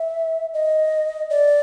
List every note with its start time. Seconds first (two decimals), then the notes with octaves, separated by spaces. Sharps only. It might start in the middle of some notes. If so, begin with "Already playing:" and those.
Already playing: E5
0.54 D#5
1.30 D5